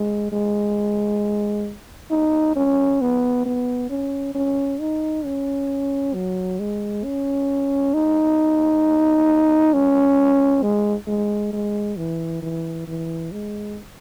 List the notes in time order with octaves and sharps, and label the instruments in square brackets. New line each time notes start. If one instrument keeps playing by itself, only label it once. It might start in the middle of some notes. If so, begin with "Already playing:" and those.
Already playing: [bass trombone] G#3
G#3
D#4
C#4
B3
B3
C#4
C#4
D#4
C#4
F#3
G#3
C#4
D#4
C#4
G#3
G#3
G#3
E3
E3
E3
G#3